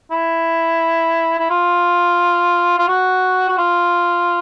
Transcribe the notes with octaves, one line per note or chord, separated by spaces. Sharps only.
E4
E4
F4
F4
F#4
F#4
F4